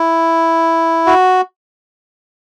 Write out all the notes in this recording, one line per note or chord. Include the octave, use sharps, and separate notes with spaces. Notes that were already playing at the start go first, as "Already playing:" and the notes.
Already playing: E4
F#4